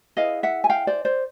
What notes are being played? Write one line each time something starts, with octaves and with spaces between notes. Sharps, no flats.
E4 G#4 B4 D#5 F5
E5 F#5
G#5
F5 G5
C5 D5
C5 D5